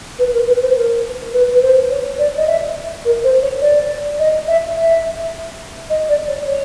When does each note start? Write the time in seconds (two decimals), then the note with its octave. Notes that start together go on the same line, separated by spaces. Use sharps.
0.18 B4
0.33 A#4
0.47 B4
0.61 C5
0.75 A#4
1.33 B4
1.54 B4
1.61 C5
1.90 C#5
2.18 D5
2.37 D#5
2.47 E5
3.04 A#4
3.23 C5
3.42 C#5
3.61 D5
4.19 D#5
4.47 E5
4.76 E5
5.89 D#5
6.08 D5
6.28 C#5
6.47 C#5